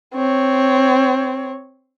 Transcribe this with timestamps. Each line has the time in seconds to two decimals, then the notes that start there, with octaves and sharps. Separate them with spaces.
0.15 C4 C#5